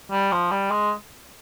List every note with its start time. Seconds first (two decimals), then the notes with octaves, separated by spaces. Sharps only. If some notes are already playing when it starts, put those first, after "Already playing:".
0.11 G3
0.32 F3
0.51 G3
0.71 G#3